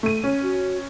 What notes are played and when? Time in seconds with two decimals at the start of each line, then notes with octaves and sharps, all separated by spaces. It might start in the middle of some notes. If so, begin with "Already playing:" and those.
0.03 A3 D#7
0.24 C#4
0.43 F#4